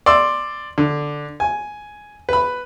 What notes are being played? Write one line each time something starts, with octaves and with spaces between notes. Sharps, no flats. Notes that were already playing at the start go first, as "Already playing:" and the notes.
D5 C6 E6
D3
G#5
B4 B5